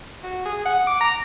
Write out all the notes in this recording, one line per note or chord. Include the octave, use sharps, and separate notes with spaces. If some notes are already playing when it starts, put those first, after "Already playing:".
F#4
G#4
F#5
D6
A#5